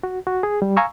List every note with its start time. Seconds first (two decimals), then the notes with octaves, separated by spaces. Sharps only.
0.03 F#4
0.27 F#4
0.43 G#4
0.62 G3
0.77 F5 G#5 A#5 C#6 E6